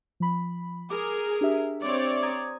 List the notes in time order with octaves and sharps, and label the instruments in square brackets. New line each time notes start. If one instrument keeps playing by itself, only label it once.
[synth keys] F3 B5
[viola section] G#4 A#4 [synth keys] D6
[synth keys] D4 G4 E5
[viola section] C4 C#5 D5
[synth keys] A#5 D#6 G#6